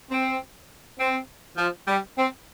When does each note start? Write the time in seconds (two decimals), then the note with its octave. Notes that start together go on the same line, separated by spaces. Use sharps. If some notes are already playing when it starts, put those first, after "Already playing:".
0.09 C4
0.98 C4
1.57 F3
1.87 G3
2.17 C4